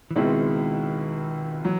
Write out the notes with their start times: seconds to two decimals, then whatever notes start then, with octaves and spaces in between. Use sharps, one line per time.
0.11 E3
0.16 C#2 B2 D#3 G#3 C4 E4
1.64 E3 F#3